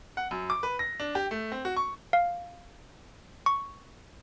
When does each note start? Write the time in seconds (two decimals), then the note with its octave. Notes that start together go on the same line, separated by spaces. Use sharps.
0.17 F#5
0.31 F#2
0.50 D6
0.63 B4
0.79 A#6
1.00 D4
1.15 G4
1.31 A3
1.52 C4
1.65 F#4
1.77 C#6
2.13 F5
3.46 C#6